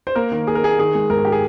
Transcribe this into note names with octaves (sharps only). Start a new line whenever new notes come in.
C5
A#3 A#4
D#3
A#3 G#4
A#4
A#3 G#4
D#3 G#4
G#3
G#2 A#4
G#4
G4
G#4